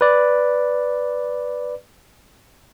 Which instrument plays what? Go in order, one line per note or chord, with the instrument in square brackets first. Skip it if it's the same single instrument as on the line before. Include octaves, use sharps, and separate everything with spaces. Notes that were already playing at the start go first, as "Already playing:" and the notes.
[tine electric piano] B4 D5